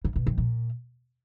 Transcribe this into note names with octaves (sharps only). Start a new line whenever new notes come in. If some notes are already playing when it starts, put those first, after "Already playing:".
C#3
B2
F2
A#2